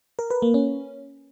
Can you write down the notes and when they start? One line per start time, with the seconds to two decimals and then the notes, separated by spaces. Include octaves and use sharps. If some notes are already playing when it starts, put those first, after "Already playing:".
0.19 A#4
0.31 B4
0.42 A#3
0.54 C#4